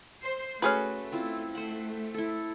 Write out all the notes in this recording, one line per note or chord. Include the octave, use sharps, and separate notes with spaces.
C5
A3 C#4 F#4 G#4 B4 C6
C4 E4 F4
A3 C5 F#5
E4 A4